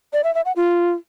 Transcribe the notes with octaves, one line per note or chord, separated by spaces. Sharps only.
D5
E5
E5
F#5
F4